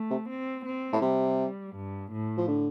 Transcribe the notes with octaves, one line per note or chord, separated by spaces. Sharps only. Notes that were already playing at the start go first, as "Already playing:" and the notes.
Already playing: A3
C3
C4
C4
A2
C3 G3
G2
A2
F3
D3